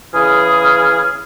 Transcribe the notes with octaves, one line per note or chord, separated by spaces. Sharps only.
C#3 E3 G#4 D#6 F6